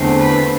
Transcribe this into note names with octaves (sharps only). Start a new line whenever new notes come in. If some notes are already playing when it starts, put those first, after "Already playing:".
Already playing: E2 D3 A3 C4
B4